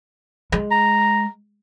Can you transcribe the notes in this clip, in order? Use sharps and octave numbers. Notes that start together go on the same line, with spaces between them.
G#3
A#5